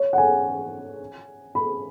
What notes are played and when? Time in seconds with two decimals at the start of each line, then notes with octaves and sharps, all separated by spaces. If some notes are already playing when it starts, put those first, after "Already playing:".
Already playing: C#5
0.13 F#5
0.18 G#5
1.55 B5